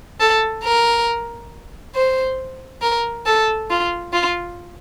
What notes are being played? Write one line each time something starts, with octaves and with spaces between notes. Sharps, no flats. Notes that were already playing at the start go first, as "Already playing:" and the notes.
A4
A#4
C5
A#4
A4
F4
F4